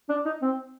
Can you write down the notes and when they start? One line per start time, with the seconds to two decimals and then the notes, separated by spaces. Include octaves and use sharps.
0.09 D4
0.26 D#4
0.42 C4